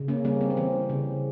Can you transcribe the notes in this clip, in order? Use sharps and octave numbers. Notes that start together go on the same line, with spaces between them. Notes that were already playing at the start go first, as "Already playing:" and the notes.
Already playing: C#3
A#3 C#4
G3 A#3 C#4
C4
C#4
E3 C4
C#3